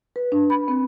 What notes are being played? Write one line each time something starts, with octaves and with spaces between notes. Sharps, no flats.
B4
D4
B5
C4